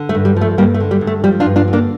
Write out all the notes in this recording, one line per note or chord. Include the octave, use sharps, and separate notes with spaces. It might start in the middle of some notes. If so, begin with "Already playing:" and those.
Already playing: D3
A3
G2
G3
F3
A3
G2 G3 A#3
A3
D3
G3
G2
A3
F3 G3
D4 F4
G2
D4 F4
D3
A#3 D4